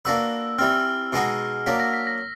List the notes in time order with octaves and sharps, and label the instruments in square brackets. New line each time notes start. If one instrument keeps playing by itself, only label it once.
[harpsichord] A#3 D4 F#4 B4 [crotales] E6
[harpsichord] E3 G3 C4 [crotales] F6
[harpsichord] B2 G#3 B3 D#4 F#4
[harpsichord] F#3 A#3 D4 [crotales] B6
[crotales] A#6
B6
A#6